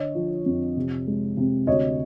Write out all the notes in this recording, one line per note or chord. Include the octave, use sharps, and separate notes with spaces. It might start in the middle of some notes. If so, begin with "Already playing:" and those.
Already playing: D3 C#5 D#5
F3
F2
C3
G#3
C3
D2 C#5 D#5